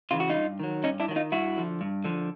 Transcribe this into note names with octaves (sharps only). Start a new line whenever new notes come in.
C#3 E3 F4
F#4
D#4 F4
G2
D#3 F#3
G2 C#4 D#4
D4 E4
D#3 F#3
D#4 F4
G2 E4 F#4
D3 F3
G2
D3 F3